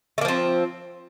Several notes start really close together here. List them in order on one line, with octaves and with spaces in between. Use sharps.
A3 A#3 F3 C4